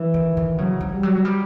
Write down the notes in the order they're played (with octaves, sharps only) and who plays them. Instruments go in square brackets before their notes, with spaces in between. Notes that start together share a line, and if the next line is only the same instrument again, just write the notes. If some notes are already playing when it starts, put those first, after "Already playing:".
Already playing: [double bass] E3
[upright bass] D#3
D#3
[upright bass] C#3 [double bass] F#3
[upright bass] F3
[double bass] G3
[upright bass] F#3
G3